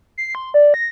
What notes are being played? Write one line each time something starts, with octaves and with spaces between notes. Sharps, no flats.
C7
C6
D5
A#6